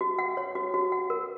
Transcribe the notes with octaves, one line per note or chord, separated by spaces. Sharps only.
F#4
F#5
C#5
F#4
F#4
F#5
A#4